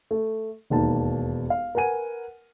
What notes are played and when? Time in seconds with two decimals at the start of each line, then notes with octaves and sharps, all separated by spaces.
0.11 A3
0.70 E1 D#2 A5
1.50 F5
1.75 A#4 B4 F#5 G#5 D#7